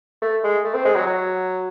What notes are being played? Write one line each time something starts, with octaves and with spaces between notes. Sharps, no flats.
A3
G#3
A3
C4
G#3
F#3
F#3